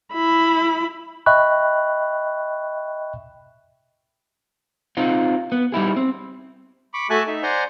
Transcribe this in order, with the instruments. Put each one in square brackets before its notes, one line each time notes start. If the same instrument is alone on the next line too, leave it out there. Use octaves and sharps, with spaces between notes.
[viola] E4 B5
[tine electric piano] D#5 E5 G5 B5 C#6 F#6
[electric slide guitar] C4 D#4 F4
B3
G3 D#4 E4 G#4
C4
[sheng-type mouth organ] B5 C#6 D6
A3 F#4 E5 G#5 A5 F#6
D#4 E5
C5 D5 F#5 G#5 A#5 C6